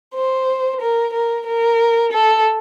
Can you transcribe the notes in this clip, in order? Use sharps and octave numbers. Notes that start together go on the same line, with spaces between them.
C5
A#4
A#4
A#4
A4